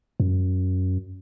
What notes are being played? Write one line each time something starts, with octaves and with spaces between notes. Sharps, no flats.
F#2